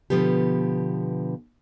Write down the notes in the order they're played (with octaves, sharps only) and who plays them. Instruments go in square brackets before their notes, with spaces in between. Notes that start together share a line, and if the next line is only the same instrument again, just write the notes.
[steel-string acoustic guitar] B2 D3 F3 B3 G4